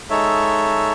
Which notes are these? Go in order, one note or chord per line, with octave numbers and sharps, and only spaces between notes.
G#3 D#4 A4 C#5 E5